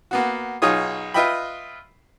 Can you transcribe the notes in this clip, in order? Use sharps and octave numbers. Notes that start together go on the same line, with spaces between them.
A#3 B3 F#4
B1 D#4 F4 G#4 C#5 D#6
F4 B4 D#5 E5 G5 B5